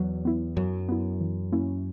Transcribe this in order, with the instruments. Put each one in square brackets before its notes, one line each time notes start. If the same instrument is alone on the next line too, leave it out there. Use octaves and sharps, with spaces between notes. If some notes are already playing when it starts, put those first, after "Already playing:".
Already playing: [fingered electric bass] E2 [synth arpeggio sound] F#3
[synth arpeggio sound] B3 E4
[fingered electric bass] F#2 [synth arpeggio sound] F#3
[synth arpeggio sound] B3 E4
E3
A#3 C#4 E4